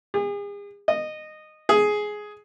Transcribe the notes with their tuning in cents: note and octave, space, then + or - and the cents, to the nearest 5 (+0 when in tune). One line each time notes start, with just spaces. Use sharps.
G#4 -40
D#5 -15
G#4 +10